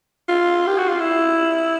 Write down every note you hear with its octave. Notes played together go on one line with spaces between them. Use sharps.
F4
G4
F#4
F4
E4